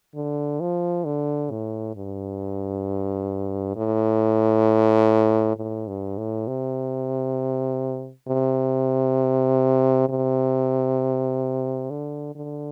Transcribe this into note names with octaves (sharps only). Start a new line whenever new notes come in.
D3
F3
D3
A2
G2
A2
A2
G2
A2
C3
C3
C3
D3
D3